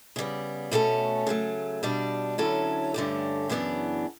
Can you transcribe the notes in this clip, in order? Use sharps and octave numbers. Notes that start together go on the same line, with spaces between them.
C#3 G3 B3
B2 A3 C#4 F#4 A4
C#3 F#3 A3
B2 G3 D4
D3 F#3 C#4 E4 A4
G2 D3 A3 C#4 G4
F#2 C#3 E3 B3 D4